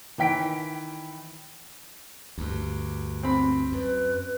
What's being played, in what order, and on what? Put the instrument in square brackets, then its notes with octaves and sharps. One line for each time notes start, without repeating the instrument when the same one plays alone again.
[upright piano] D#3 E3 G5 B6 D7
[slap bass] D2 G2
[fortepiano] C4 B5
[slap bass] F#2 [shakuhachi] B4